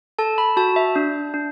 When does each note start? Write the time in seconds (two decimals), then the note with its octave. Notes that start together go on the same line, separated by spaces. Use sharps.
0.19 A4 A5
0.38 B5
0.57 F#4 A5
0.76 E5
0.96 D4
1.34 D4